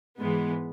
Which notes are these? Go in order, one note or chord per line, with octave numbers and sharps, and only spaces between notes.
G#2 E3 G#3 B3